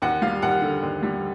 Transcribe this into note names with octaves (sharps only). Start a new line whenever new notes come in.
D#2 F#5
G3 F5
D#2 F#5
D3
D#2
G3